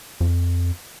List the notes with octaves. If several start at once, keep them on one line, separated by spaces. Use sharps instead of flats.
F2